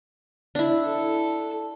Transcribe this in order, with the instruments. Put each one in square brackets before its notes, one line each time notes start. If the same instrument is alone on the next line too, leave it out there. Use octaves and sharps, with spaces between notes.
[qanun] D4 E4
[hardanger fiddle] A4